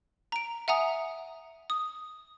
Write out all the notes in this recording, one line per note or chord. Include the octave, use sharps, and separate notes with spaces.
A#5 D7
E5 F#5 G#5 A#5 D#6
D#6